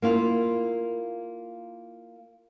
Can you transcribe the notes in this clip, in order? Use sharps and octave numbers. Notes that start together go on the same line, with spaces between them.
A#3 E4 F4 A#4